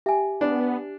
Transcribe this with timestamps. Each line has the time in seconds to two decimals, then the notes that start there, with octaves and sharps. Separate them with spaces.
0.06 G4 E5 G#5
0.41 B3 D4